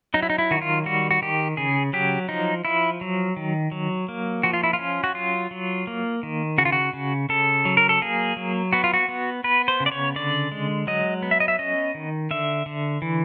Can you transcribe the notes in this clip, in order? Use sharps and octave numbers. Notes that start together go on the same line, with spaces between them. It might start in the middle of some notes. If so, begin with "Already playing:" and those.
F#3 D#4
E4
D#4
E4
D#3 F#4
F4
G3 F#4
F#4
D#3 G4
C#3 G#4
F#3 G4
F3 D#4
F3 E4
F#3
D#3
F#3
A#3
F3 F#4
F4
E4
F4
C#4
F#4
F#3 F4
F#3
A#3
D#3
C#3 F#4
F4
F#4
C#3
C#3 A4
F#3
A#4
A4
A#3 G#4
F#3
B3 F#4
F4
F#4
B3
B3 B4
C5
C#3
D5
C#5
D3 D5
G#3
F#3 D#5
B3
E5
D#5
E5
C#4 D#5
D#3
D3 E5
D3
E3